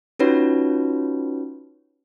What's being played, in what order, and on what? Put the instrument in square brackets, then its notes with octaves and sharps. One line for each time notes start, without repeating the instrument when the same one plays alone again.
[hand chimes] C#4 D#4 F4 F#4 B4 C#5